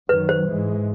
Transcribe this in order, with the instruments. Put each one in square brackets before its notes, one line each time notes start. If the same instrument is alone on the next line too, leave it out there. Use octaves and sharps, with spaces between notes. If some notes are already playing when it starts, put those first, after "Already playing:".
[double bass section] F#2 D#3 F#3 [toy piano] B4
[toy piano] C5
[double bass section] G#2 E3 G#3